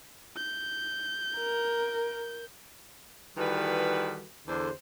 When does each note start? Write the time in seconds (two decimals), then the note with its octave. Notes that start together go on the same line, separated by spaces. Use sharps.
0.36 G6
1.37 A#4
3.38 D#3 E3 G3 F#4 A4 B4
4.47 E2 D3 C5